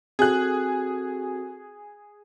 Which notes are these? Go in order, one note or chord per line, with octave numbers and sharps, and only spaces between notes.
C4 F#4 G#4 A4 F#6